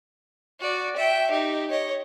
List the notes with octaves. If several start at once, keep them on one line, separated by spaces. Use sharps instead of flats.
F#4 D5
E5 G5
D#4 G4
C#5 D#5